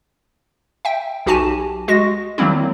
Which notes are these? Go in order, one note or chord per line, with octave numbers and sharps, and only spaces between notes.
E5 G5
B1 F#4 G4 G#5 A5 E7
G#3 F#4 A#6
D#3 F#3 G3 A#3 C4 E4